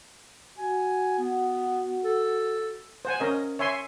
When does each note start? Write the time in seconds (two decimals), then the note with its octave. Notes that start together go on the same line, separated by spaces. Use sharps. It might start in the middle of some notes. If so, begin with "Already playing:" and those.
0.58 F#4 G#5
1.19 B3
2.04 A4
3.05 C5 F#5 G#5
3.20 C#4 A#4 D#5
3.59 C#5 E5 G#5 C6